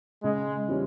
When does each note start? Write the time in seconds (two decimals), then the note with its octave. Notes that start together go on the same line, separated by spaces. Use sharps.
0.24 C#3 G#3
0.68 E3 G3 C#4 F4